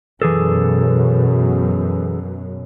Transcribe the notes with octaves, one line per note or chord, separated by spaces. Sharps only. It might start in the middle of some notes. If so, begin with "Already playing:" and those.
F#2 B2 E3 G#4 A4